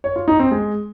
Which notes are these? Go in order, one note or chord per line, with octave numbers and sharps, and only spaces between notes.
C#5
F4
D#4
C4
G#3